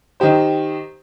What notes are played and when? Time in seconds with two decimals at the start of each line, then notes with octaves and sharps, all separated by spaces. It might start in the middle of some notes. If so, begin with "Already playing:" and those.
0.20 D#3 D#4 G4 C5